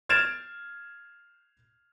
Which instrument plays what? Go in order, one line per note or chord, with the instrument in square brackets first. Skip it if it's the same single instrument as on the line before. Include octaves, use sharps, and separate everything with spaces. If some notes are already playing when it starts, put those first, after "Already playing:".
[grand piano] F6 G#6 A6 D7 E7 F7